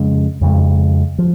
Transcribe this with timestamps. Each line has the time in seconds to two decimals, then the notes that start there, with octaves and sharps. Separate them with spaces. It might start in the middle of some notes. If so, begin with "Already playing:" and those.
Already playing: F2 C#3 G#3
0.41 F2 C#3 G#3
1.19 F3